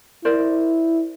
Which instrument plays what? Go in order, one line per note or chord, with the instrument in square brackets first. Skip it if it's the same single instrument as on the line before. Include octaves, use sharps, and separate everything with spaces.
[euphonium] E4 [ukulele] A#4 C5 D5